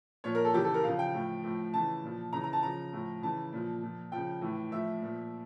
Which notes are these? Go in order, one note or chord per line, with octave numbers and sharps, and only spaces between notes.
A#2 F3 C#5
A#4
A4
C#3 E3 G4
A4
A#4
C#3 F3 F5
G5
A2 F3
A2 F3
C#3 E3 A5
A#2 F3
C#3 E3 A#5
A#5
A5
C#3 F3 A#5
A2 F3
C#3 E3 A5
A#2 F3
A#2 F3
C#3 F3 G5
A2 E3
A2 F3 E5
A#2 F3